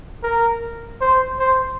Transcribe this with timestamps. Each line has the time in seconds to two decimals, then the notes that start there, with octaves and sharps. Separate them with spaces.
0.23 A#4
1.01 C5
1.40 C5